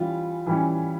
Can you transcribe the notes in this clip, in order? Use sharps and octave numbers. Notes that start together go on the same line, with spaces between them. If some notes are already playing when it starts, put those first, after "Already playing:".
Already playing: E3 G3 C#4 F4
E3 G3 C#4